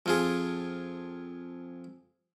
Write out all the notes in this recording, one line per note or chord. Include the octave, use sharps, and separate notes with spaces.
F2 F4 G#4